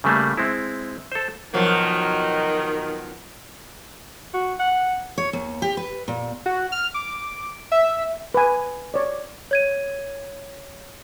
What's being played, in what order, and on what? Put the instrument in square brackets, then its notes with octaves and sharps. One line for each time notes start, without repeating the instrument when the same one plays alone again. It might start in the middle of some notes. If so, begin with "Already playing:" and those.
[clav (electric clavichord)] C#3 G3 A3 A#3
G#3 C4 E4
A4 C5
[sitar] B2 F3 F#3 [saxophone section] D#3
[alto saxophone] F#4
F#5
[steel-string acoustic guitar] C#5
D#2
G4
B4
A#2
[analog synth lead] F#4
F6
D6
E5
[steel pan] B4 G#5
C#5 D5
[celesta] C#5 G#6 D#7